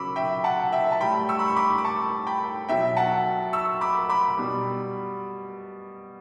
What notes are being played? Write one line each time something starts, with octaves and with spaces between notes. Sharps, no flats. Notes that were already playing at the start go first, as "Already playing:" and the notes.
Already playing: C#3 F#3 B5 C#6 D6 E6
E5 G5
F#5 A5
E5 G5
A5
A2 G3 G5 B5
C#6 E6
B5
C#6
B5 D6
D6
A5 C#6
G5 B5
B2 F#3 E5 G5
F#5 A5
C#6 E6
B5 D6
B5 D6
B2 G3